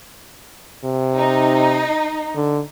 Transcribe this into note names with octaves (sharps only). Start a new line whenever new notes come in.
C3
D#4
D3